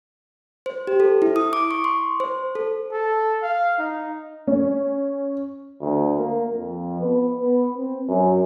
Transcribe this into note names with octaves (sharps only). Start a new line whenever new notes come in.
C5
G4
A4
E4
D#6
D6
C#6
C6
C5
A4
A4
F5
D#4
C#4
D2
A#3
F2
B3
B3
C4
F#2